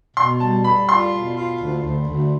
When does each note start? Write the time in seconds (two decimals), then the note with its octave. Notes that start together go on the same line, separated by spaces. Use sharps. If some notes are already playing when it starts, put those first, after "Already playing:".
0.16 B2 C6
0.40 G3 A5
0.64 G3 B5
0.89 F4 C6
1.12 B2
1.36 F4
1.61 D2
1.84 D2
2.08 D2